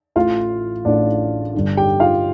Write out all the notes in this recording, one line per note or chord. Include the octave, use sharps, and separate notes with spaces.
A1 A2 F4 F5
A1 A2 D4 D5
G1 G2 D3
G4 G5
F4 F5